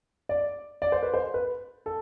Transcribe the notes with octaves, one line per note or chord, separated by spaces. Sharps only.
D5
D5
C5
B4
C5
B4
A4